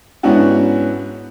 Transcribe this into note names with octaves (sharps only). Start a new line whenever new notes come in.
G#2 B3 C#4 D4 E4 F#4